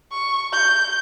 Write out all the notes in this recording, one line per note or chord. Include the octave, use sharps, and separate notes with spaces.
C#6
G6